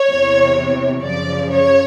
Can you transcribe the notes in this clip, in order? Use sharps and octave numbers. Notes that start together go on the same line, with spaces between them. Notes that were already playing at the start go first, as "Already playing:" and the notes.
Already playing: C#5
E2 C3 E3
F#2 C#3 F3 D5
C#5